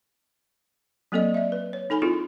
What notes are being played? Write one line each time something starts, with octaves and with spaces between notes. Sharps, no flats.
F#3 A#3 C4 A4 D5 D#5
D5 E5
B4
C#5
D#4 A4 G#5 B5
C4 E4 F4 G#4 A4